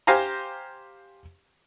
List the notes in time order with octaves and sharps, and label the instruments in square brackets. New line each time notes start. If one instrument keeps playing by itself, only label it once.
[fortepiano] G4 C5 F5 G#5 A#5